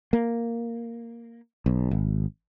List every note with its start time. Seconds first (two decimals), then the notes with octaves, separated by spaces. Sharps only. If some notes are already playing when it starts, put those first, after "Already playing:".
0.13 A#3
1.66 B1
1.91 G#1